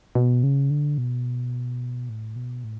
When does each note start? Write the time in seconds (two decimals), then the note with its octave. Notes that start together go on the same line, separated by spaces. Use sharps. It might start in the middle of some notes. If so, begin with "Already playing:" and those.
0.15 B2
0.43 C#3
0.70 D3
0.98 B2
2.09 A2
2.36 B2
2.64 A2